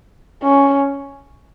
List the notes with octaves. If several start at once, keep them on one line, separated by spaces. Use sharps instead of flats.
C#4